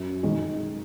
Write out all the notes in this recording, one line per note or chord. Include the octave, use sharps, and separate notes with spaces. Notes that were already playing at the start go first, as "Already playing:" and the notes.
Already playing: F#2
D#3 G#3